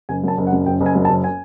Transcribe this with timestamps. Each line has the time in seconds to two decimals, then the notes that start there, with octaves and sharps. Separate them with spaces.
0.09 F#1 G#5
0.23 F#2 A5
0.38 F#1
0.47 F#5
0.53 F#2
0.66 F#1 G5
0.81 F#1
0.86 G#5
0.95 F#2
1.05 A5
1.10 F#1
1.24 G#5